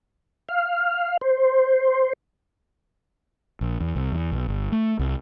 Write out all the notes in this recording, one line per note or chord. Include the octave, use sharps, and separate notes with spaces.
F5
C5
A#1
E2
C2
E2
B1
G1
A3
C2